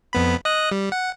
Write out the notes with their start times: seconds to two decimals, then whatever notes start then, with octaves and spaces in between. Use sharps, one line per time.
0.13 F2 B3 B5
0.45 D#5 D#6 F#6
0.72 G3
0.92 F#5